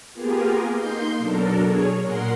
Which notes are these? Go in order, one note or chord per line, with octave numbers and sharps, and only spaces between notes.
A#3 B3 F4 G4 G#4 A#4
A#3 D#4 C6 G6
B2 F#3 D4 A4 A#4
G#4 C#5
A#2 A#4 F#5 C6